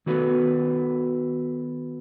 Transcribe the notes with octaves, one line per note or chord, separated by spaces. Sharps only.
D#3 B3 F#4 A4 B4